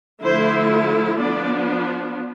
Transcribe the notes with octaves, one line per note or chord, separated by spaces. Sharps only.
D3 F3 A3 E4 C5
F3 B3 D4 D5